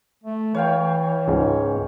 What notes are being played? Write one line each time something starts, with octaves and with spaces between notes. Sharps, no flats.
A3
E3 C#5 F5 G5
C#2 G#2